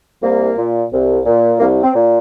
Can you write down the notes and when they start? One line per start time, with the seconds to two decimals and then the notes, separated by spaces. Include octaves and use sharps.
0.22 C2 A#3
0.57 A#2
0.92 C2
1.26 A#2
1.60 C2 A#3
1.83 C4
1.94 A#2